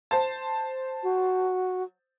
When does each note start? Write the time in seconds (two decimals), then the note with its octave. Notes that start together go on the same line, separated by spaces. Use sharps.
0.11 C5 A5
1.03 F#4